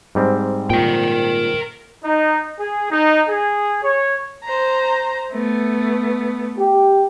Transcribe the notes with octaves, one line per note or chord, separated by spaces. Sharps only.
G#2 G3 C4
A#2 A#4 G5
D#4
G#4
D#4
G#4
C#5
C5 A#5
A3 B3
G4